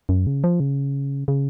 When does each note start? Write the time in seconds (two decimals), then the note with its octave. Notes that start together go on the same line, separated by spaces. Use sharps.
0.09 F#2
0.27 C#3
0.44 F3
0.60 C#3
1.28 C#3